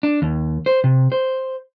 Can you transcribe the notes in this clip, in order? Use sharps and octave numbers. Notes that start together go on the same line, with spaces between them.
D4
D#2
C5
C3
C5